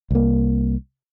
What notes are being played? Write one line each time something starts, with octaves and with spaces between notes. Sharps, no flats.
C2 A#3